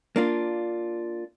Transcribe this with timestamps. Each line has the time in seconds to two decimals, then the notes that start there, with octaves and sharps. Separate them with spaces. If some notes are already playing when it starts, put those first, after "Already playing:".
0.16 A#3 D4 F4